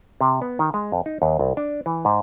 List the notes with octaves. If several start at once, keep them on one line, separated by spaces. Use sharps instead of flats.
C3
B3
D#3
G#3
F2
D#4
D#2
C2
D4
E3
G#2